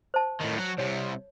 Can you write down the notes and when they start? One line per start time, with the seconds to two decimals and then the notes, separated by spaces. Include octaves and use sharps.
0.14 C5 A5
0.40 A2 D#3
0.58 F#3 F#4
0.78 C2 C3 C#5